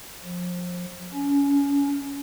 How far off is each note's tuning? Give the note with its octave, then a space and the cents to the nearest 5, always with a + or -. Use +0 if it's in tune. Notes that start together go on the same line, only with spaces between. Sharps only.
F3 +30
C#4 +30